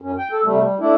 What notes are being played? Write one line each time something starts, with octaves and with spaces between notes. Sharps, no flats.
F#2 C#4
G5
A4
C3 G3 A3
G3
A3 D4 E4